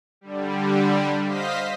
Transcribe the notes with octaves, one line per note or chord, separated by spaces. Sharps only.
D3 G3
C5 D#5 F5 B6